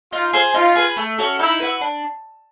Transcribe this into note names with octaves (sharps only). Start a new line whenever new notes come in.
D#4 F4
G#4 C5
D#4 F4
G#4 B4
A3
C#4 F#4 A4
D#4 E4
F#4 B4
D4